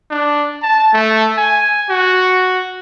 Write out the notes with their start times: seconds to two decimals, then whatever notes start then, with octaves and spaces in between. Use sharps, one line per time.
0.10 D4
0.62 A5
0.93 A3
1.38 G#5
1.89 F#4